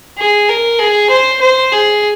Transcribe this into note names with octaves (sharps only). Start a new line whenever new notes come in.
G#4
A#4
G#4
C5
C5
G#4